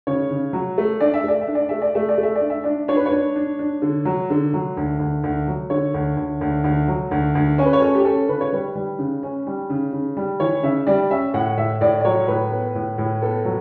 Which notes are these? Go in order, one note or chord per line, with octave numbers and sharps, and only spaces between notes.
C#3 C#5
C#3
F#3
A3
D4 D5
E5
A3 D5
E5
D4
D5
A3 E5
D5
A3 E5
D5
A3
E5
D5
D4
E5
D4 D5
D4 C#5
B4
C#5
D4
D4
D4
D3
F#3
D3
F#3
D2
D2
D2
F#3
D3 C#5
D2
D2
D2
D2
F#3
D2
D2
C#4 C#5
B4
C#5
C#4 A4
G4
C#4 A4
C#3 B4
C#5
G3 B4
G3
C#3
C#4
G3
C#3
C#3
G3
E3 C#5
C#3 E5
G3 D5
C#4 E5
A2 F#5
A2 E5
A2 D5
D5
F#3 C#5
A2 B4
B3
A2
A2
B3 A4
F#3